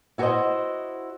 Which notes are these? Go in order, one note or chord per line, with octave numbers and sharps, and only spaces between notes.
E4 F#4 G#4 A#4 C5 D#5